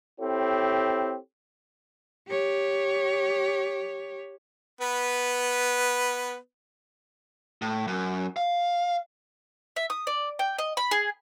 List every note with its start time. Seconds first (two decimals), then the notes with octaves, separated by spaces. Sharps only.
0.20 C4 E4 G4 A4 C#5
2.28 G4 C#5
4.81 B3 B4
7.62 A2
7.87 F#2
8.37 F5
9.76 E5
9.90 D#6
10.07 D5
10.39 G5
10.58 D#5
10.77 B5
10.91 G#4